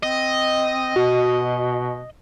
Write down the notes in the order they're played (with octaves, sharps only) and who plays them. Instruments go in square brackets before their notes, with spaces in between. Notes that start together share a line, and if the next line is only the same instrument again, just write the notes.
[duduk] C4 [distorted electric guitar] D#5
[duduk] B2 [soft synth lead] F#4